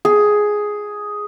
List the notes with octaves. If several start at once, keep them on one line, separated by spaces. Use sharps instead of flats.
G#4